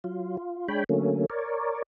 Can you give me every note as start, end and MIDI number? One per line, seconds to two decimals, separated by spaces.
0.04 0.37 54
0.04 0.37 65
0.37 0.68 65
0.68 0.84 56
0.68 0.84 62
0.68 0.84 73
0.68 0.84 79
0.68 0.84 83
0.89 1.26 50
0.89 1.26 54
0.89 1.26 57
0.89 1.26 58
0.89 1.26 61
1.30 1.82 70
1.30 1.82 73
1.30 1.82 74